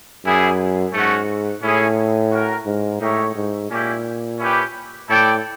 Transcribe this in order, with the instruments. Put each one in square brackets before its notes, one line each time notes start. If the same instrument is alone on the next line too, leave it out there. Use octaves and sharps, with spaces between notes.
[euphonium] F#2 [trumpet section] G3 B3 E4 G#4
[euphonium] G#2 [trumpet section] A3 C#4 F#4
[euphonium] A2 [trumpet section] C#4 E4 G#4 C#5
[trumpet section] C#4 F#4 A#4
[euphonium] G#2
[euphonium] A2 [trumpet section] D#4 G4 A#4 C#5 E5
[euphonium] G#2
[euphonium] A#2 [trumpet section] A#3 C#4 E4 G4
[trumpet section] C#4 E4 G4 B4
[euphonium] A2 [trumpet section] E4 A4 D5 G5